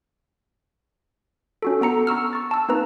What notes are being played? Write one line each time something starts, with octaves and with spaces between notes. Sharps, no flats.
C#4 F#4 A4
B3 A4 A#5 C#7
A#5 C#6 E6 F6
C#6 A6
A5 E6
A#3 C4 D#4 B4 A#5